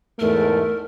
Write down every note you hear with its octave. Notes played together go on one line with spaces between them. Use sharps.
E2 G#2 A3 A#4